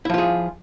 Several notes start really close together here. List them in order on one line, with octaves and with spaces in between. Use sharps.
E4 F3 F4 G#4